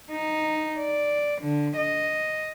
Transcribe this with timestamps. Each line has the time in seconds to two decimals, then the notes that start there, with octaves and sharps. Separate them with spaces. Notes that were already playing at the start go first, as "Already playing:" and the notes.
0.11 D#4
0.79 D5
1.42 D3
1.77 D#5